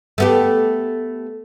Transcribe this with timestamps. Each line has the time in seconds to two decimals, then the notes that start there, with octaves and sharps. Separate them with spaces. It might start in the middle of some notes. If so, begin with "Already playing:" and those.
0.18 A3 B3 G4